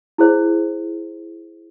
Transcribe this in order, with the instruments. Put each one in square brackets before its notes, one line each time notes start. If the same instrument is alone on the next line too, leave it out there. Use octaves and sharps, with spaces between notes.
[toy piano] E4 G#4 C5